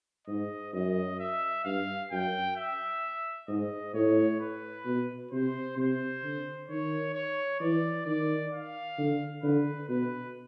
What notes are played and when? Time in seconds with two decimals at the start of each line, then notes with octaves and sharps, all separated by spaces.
0.28 G#2 D#5
0.73 F#2 D#5
1.20 E5
1.65 G2 F5
2.11 F#2 G5
2.57 E5
3.48 G#2 D#5
3.94 A2 C#5
4.40 B4
4.85 B2
5.32 C3 C5
5.77 C3 C5
6.24 D3
6.68 D#3 C#5
7.14 C#5
7.60 E3 D5
8.05 D#3 D5
8.52 F5
8.98 D3
9.43 D3 B4
9.89 B2 B4